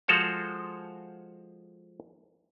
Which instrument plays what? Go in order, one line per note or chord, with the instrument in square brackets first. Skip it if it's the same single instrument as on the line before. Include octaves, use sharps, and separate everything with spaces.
[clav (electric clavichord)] F3 G#3 F#4 A4 C5 F5